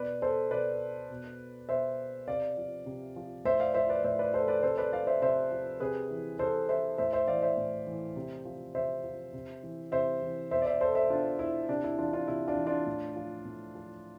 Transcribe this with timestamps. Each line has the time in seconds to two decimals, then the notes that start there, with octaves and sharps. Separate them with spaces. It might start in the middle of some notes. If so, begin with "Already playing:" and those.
Already playing: B2 B4 D5
0.22 A4 C5
0.51 B2 B4 D5
1.10 B2
1.69 B2 C5 E5
2.28 C3 D5 F5
2.57 F3
2.86 C3
3.16 F3
3.45 A2 C5 E5
3.60 D5 F5
3.74 F3 C5 E5
3.89 B4 D5
4.04 A2 C5 E5
4.19 B4 D5
4.33 F3 A4 C5
4.48 B4 D5
4.63 C3 A4 C5
4.78 B4 D5
4.92 F3 D5 F5
5.07 C5 E5
5.22 C3 C5 E5
5.51 F3
5.80 C3 G#4 B4
6.10 E3
6.39 C3 A4 C5
6.69 E3 C5 E5
6.98 A2 C5 E5
7.13 C5 E5
7.28 E3 D5 F5
7.42 C5 E5
7.57 A2
7.87 E3
8.16 C3
8.45 F3
8.74 C3 C5 E5
9.04 F3
9.33 C3
9.63 E3
9.92 C3 C5 E5
10.22 E3
10.51 B2 C5 E5
10.62 D5
10.66 C5 E5
10.81 A4 C5
10.95 C5 E5
11.10 B2 D4 F4
11.39 E4
11.69 C3 D4
11.84 E4
11.98 E3 D4 F4
12.13 D4 F4
12.28 C3 E4
12.48 D4 F4
12.57 E3
12.66 D4 F4
12.86 A2
13.16 F3
13.45 A2
13.75 F3